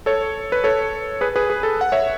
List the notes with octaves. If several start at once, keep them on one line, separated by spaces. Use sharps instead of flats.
A4 C#5
B4
A4 C#5
G#4 B4
G#4 B4
G#4
A4
F#5
C#5 E5